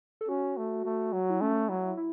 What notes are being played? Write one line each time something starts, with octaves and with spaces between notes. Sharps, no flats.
A4
C#4 F#4
A3
A3
F#3
E4
A3 C#4
F#3 E4
E4